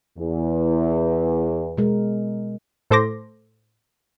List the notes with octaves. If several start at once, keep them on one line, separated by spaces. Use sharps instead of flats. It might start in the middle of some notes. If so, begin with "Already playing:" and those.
E2
B2 G#3 A#4
A2 A4 C5 C6 D6 A#6